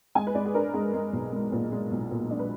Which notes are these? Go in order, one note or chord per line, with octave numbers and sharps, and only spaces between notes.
G#3 G#5
B4
G#3 D5
G#4
D4 A#4
G#3 G#4
G#3
B1
G#3
A#2
G#3
B1
A#2
D4
B4